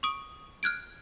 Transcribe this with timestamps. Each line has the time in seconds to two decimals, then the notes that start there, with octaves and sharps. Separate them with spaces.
0.03 C#6 D#6 D7
0.63 F6 F#6 G#6 D7